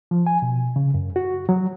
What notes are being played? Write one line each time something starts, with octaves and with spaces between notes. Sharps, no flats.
F3
G#5
B2
C#3
F#2
F#4
F#3